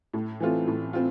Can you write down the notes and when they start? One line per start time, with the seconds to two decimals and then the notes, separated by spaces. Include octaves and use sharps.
0.14 A2
0.40 E3 A3 C4 F4
0.68 A2
0.93 C4 F4